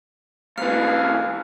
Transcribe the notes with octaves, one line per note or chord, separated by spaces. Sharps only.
G#2 E3 B4 F5 F6